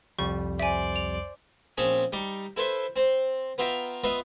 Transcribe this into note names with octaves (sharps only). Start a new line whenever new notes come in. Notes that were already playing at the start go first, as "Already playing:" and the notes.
C2 F2 G3 C#6
C5 D5 E5 G#5
F7
A#1 C4 C#4 C#5 A5 D#6
G3 D#4 D5
E4 A4 B4 C5 E5
C4 C5
B3 F4 E5 G5 A#5
B3 F4 B4 D#5 E5